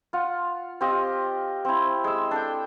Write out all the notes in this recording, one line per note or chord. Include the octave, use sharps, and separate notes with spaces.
F4 F#5
C4 F4 G4 D#5
C4 E4
G#3 E6
D4 A4 G5